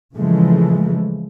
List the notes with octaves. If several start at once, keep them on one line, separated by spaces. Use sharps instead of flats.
C#3 E3 F3 G#3 A3